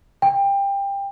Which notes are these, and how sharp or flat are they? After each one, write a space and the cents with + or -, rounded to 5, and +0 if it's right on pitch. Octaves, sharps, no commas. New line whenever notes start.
G5 +20